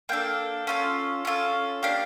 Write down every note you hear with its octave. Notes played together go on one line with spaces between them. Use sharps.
A#3 D4 A4 G5
C#4 F4 A4
C#4 F4 A4
A#3 D4 G4 F5